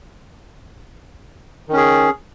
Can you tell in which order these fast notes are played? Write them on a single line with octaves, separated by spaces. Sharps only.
D#3 C#4 G#4